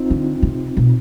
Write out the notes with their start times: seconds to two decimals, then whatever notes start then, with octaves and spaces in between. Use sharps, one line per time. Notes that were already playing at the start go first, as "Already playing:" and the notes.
Already playing: C4 D#4 F4
0.10 D3
0.42 C3
0.77 B2